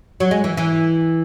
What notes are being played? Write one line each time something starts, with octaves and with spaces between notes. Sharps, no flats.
F#3
G#3
E3
E3